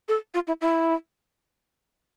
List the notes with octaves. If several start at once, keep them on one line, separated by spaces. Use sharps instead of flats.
A4
F4
E4
E4